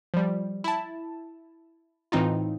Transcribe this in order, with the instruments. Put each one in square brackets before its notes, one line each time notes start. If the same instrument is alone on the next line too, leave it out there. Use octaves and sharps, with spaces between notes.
[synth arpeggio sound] F3 G3
E4 A5
A2 E3 C4 D#4 F4